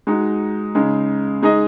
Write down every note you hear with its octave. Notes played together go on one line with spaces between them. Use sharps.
G#3 D#4 F#4
C#3 G#3 D#4
G#3 D#4 G#4 D#5